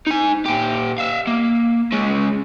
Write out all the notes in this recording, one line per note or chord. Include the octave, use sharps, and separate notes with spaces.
D#4 G#5
A#2 G4
E5 F5
A#3
G#3 C#4